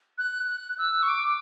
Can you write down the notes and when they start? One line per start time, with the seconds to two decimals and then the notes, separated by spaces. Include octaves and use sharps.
0.18 F#6
0.48 F#6
0.78 E6
1.02 C#6
1.08 D6